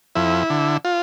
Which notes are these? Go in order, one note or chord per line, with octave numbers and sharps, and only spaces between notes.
F2 E4
D3
F4